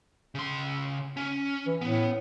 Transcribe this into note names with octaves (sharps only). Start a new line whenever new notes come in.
C#3 C6
C#4
E3
A2 B3